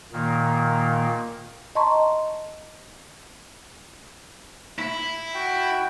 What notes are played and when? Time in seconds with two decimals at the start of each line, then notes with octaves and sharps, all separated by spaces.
0.13 A#2 D#3 A#3
1.75 D#5 A5 A#5 C6 C#6
4.79 E4
5.34 F#4 G5